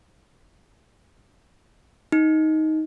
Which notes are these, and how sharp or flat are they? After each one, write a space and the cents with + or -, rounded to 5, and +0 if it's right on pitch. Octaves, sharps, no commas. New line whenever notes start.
D#4 +10